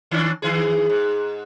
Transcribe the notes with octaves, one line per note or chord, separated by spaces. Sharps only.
D#3 C#4 D4
D#3 E3 G#4
G#2